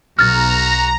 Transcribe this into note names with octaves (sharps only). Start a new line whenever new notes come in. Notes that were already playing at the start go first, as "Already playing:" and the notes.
B1 F#4 A#5 F6 A6